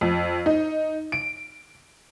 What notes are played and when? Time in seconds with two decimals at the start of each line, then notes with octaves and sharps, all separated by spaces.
0.01 F2
0.46 D#4
1.12 D7